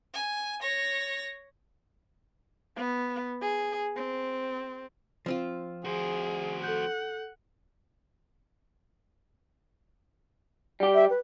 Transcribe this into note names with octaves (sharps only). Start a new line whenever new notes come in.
G#5
C#5 A#6
B3
G#4
C4
F3 C4 F4
F#4 G#4 C5
A4 F#5 G6
G3 G4
E5
B4